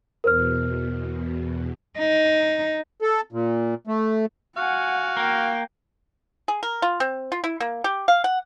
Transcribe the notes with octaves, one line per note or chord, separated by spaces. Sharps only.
E2 B2 A#4 C5 F6
D#4
A4
A#2
A3
F#4 F5 F#5 G#5
A#3 G5
G#4
A#4
F4
C4
F4
E4
A#3
G4
F5
F#5